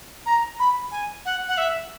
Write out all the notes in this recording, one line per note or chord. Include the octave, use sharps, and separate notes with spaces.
A#5
B5
G#5
F#5
F#5
E5